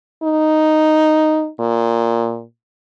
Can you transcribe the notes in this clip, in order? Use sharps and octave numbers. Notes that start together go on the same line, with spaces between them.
D#4
A#2